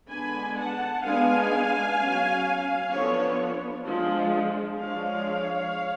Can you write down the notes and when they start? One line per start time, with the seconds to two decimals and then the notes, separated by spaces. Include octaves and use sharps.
0.10 D3 G#3 B3 D4 G#5 B5
0.57 F#5 A5
1.04 G#3 B3 D4 F5 G#5
1.98 F#3 C#4
2.92 F3 B3 D4 A4 C#5
3.86 F3 G#3 D4
4.79 F3 G#3 D4 C#5 F5